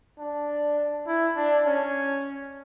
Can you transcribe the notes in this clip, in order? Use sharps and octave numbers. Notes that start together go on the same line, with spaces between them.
D4
E4
D4
C#4